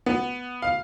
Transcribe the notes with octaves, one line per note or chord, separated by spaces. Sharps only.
B3
F5